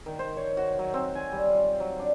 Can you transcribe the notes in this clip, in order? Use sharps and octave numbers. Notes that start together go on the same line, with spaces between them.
D#3
C5
C#5
F#4
F#3
C4
G#5
G3
F4
F#3
D4